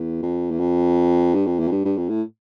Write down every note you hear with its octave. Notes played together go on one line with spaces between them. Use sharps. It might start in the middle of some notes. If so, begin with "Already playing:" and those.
Already playing: E2
F2
E2
F2
G2
F2
E2
F2
G2
G2
F2
A2